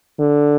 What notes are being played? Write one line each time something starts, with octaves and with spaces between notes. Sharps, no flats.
D3